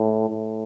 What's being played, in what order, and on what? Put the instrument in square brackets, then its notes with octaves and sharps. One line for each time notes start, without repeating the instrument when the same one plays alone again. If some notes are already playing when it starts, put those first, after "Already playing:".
Already playing: [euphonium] A2
A2